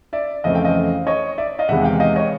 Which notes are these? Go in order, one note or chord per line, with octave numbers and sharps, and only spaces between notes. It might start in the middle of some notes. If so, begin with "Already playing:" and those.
D5 E5
F2 C#3 E3 A3 C4 D#5 F5
F5 G5
D#5 F5
C#5 D#5
D5 E5
D#5 F5
E2 C3 D#3 G#3 B3 E5 F#5
F5 G5
D#5 F5
C#5 D#5